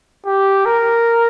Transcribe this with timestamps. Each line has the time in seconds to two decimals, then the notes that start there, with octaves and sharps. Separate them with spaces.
0.26 G4
0.65 A#4